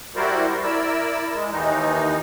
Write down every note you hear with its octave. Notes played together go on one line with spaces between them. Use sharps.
G3 E4 F#4 A#4 C5 D5
E4 A#4 D5 E6
G#3
D#2 D#3 E3 D#4